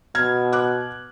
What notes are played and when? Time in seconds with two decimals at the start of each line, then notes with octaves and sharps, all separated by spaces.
0.15 B2 F6 G#6
0.53 D6 F#6